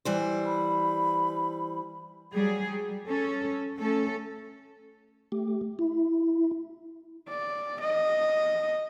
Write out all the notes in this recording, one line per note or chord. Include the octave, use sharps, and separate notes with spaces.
E3 G3 C5
B5
F#3 G3 G#4
G3
C#4 A4
A3 C#4 A4
A3 G4
E4
D5
D#5